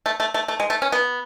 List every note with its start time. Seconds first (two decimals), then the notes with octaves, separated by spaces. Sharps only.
0.06 A3
0.20 A3
0.34 A3
0.48 A3
0.60 G#3
0.70 A3
0.82 C#4
0.92 B3